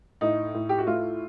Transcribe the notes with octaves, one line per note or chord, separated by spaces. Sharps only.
A2 D#4
A2
G4
F#4
A3 F4